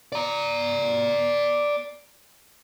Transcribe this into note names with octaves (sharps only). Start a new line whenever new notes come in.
D5 A#5